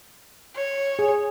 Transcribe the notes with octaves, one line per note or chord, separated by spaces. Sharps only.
C#5
G#4